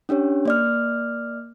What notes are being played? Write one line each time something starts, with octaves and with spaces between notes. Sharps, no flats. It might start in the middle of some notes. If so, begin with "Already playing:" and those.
C#4 D4 G4 C#5
A#3 D5 F6